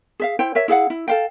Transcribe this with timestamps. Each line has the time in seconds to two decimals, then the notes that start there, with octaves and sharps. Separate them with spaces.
0.20 G#4 E5 F5
0.39 E4 C5 G5
0.55 A#4 C#5 E5
0.68 E4 G#4 F5 F#5
0.90 E4
1.08 A4 F5 G5